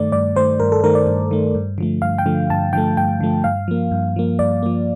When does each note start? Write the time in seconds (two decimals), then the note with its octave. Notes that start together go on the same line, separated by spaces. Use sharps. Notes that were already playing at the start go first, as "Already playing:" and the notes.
Already playing: G2 D#3 A3 D5
0.12 G2 D5
0.36 D#3 A3 C5
0.60 G2 A#4
0.72 A4
0.84 D#3 A3 A#4
0.95 D5
1.07 G2
1.31 D#3 A3
1.55 G2
1.78 D3 F3 A3
2.02 G2 F5
2.18 G5
2.26 D3 F3 A3
2.50 G2 A5
2.73 D3 F3 A3 G5
2.97 G2 G5
3.20 D3 F3 A3
3.44 G2 F5
3.68 F3 A#3
3.91 G2
4.16 F3 A#3
4.39 G2 D5
4.63 F3 A#3